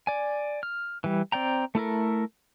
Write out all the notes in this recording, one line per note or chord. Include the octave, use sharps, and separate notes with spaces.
D5 G#5
F6
E3 G3
C4 D5 G5 A#5
A3 E4 A4 A#4